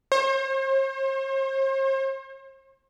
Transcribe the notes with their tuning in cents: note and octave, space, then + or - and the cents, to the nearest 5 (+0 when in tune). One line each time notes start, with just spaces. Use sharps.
C5 +45